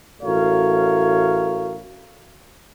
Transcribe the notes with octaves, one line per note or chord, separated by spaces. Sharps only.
A1 A3 F#4 A#4 C#5 F5